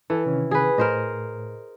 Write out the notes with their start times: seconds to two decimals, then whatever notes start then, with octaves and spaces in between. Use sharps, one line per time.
0.10 E3 A4
0.26 C3 D#3 C#4
0.51 G#4 B4
0.78 A2 A#4 C5 D#5